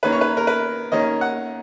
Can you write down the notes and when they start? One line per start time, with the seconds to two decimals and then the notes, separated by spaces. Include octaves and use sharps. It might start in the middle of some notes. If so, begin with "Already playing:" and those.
0.03 D#3 A#3 C#4 B4
0.12 C#5
0.21 B4
0.37 A#4
0.47 B4
0.92 D#3 A#3 C#4 D#5
1.21 F#5